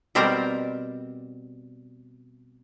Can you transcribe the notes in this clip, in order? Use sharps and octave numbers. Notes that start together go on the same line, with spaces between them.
B2 G3 C4 A#4 D5 A#5